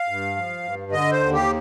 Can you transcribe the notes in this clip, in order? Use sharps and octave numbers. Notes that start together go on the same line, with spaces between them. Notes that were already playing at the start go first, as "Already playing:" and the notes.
Already playing: F5
G2
F3
G2
D3 D#5
C5
D#2
G4